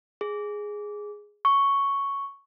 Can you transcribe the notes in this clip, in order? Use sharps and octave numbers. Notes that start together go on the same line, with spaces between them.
G#4
C#6